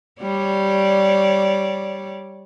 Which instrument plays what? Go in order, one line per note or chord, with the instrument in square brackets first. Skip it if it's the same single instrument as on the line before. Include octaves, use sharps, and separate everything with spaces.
[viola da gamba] G3 C#5 D5